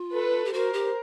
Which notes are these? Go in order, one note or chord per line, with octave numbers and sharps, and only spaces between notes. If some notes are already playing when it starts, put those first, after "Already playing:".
Already playing: F4
A4 B4
G4
F#4 A#4 C5
G4